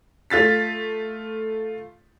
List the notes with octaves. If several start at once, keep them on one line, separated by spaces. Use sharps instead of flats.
A3 F4 A6 B6